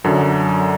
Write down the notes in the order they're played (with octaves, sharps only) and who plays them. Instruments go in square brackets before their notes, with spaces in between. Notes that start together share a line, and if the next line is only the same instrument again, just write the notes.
[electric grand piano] F#2 D3 F#3